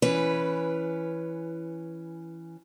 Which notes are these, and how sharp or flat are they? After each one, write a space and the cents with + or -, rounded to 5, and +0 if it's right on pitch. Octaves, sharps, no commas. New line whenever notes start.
E3 +10 C#4 +0 B4 -5